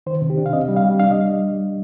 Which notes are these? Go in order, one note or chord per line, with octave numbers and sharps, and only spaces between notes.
D#3 C5
C3
G4
D4
F5
C4 D#5
G3
F5
G3
D4 F5
D#5